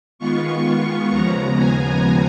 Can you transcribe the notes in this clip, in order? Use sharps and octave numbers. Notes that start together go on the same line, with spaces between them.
D#3 G#3 B3 F4 C#6
D#2 C#3 F3 G#3 B3 A#5
G#5